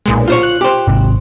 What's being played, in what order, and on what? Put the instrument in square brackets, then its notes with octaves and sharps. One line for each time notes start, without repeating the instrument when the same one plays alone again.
[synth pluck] B1 A#2 G#3
[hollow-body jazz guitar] F4 C5 C#5
[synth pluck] F#6
[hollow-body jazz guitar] G4 C5
[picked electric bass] G#1 C3